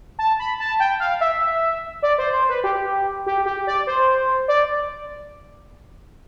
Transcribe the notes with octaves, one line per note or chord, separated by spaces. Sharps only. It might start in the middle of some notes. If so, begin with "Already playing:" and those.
A5
B5
A5
G5
F5
E5
D5
C5
C5
B4
G4
G4
G4
D5
C5
D5